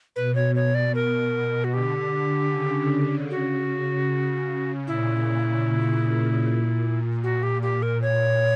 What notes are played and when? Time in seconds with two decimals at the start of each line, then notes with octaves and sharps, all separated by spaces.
0.16 B2 B4
0.35 C#5
0.55 C#5
0.75 D5
0.95 A#4
1.64 F#4
1.73 D3 G4
2.51 C#3
3.30 F#4
4.87 A#2 E4
7.23 F#4
7.43 G4
7.62 G4
7.82 A#4
8.02 A#2 C#5